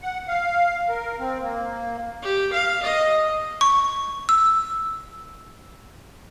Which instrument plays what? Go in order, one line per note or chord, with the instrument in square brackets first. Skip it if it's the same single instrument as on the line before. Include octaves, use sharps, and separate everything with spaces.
[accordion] F#5
F5
A#4
C4
A#3
[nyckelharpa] G4
F5
D#5
[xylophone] C#6
E6